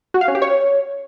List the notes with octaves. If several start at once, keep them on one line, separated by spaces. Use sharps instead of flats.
F#4
F5
C#4
G4
C#5